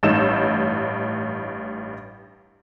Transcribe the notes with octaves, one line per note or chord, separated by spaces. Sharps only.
A1 G2 D#4 E6 G6 E7